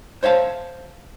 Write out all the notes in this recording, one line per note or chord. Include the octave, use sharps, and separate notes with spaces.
C5 C#5 E5 F5 A5